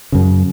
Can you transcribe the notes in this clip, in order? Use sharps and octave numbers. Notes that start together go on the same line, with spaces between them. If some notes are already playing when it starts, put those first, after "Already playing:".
F#2 C#3